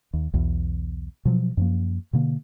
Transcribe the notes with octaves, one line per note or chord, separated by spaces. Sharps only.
D#2
B1 E2 B2
B2 F3 F#3
F#2 F3 A#3
B2 D3 A#3